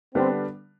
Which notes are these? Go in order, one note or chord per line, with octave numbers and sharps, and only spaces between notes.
D3 G3 B3 C4 D4